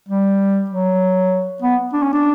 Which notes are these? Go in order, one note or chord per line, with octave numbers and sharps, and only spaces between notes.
G3
F#3
B3
D4
C#4
D4